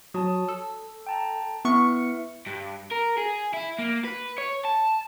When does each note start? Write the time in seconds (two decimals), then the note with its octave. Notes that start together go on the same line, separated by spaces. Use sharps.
0.14 F#3 C#5 A5 D#6
0.48 A4 E6
1.06 G5 A5 A#5
1.65 B3 E4 E5 C#6 F6 C#7
2.46 G2
2.91 A#4
3.17 G#4
3.53 E4
3.78 A#3
4.04 B4
4.38 C#5
4.64 A5